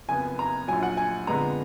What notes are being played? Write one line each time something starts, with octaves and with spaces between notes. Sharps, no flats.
F#1 F2 F3 B3 G#5
A#5
A#1 A#2 F#3 G#5
F#5
G#5
F2 D3 G#3 B3 A#5